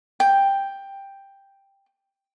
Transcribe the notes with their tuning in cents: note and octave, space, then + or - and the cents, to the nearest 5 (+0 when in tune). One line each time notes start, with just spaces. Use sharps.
G5 +10